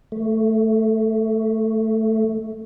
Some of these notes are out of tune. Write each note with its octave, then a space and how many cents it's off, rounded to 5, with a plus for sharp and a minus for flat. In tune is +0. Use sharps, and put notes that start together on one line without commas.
A3 +0